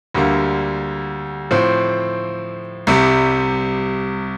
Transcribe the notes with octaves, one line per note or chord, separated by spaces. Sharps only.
D2 D3 G3 A#3
A2 F3 C4
C2 C3 G3